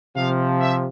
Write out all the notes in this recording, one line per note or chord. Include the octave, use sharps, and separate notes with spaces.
C3 F3 F5
E5